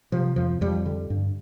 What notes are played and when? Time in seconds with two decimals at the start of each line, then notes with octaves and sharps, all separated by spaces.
0.12 C3 F3
0.36 F2 F3
0.61 F2 G3
0.86 D3
1.10 G2